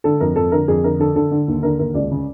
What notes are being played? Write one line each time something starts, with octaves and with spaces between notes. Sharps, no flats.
D3 A4
F2 A#4
F2 A4
D3 A#4
F2 G#4
D3 A#4
D3 A4
D3 A4
D3
D#2
D3 A#4
D#2 A#4
C#2 D5
C#3